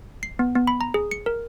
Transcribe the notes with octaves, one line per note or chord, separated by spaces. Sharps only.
C7
B3
B3
B5
A#5
G#4
C#7
A#4